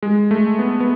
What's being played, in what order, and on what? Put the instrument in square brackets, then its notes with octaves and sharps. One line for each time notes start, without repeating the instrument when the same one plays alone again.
[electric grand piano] G#3
A3
B3
B3